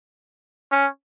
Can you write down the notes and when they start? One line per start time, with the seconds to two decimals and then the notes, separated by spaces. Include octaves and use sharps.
0.72 C#4